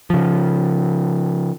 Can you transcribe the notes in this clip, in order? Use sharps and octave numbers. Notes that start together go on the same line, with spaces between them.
C#3 F3